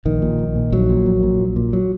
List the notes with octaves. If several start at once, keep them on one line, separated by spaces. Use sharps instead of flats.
A#1 D#3
A#2
A#1
A#2
A#1 F#3
A#2
A#1
A#2
A#1
A#2
F#3